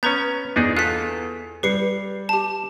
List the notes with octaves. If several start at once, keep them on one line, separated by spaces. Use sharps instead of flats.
B3 C#4 B4 A#5 G6
E2 D4 D#4 G#4
F4 A4 F#6 B6
G3 B4 C7 C#7
G4 A5